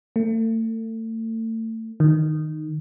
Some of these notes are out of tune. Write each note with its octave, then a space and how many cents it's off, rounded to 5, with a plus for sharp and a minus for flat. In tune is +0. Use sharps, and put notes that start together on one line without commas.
A3 +35
D#3 -10